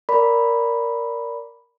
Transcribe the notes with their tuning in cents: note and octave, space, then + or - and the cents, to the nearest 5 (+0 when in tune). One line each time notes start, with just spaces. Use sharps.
A#4 +0 D5 -20 B5 +0